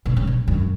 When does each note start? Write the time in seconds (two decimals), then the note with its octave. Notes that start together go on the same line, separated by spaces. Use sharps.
0.05 B2
0.16 C#3
0.27 B2
0.48 F#2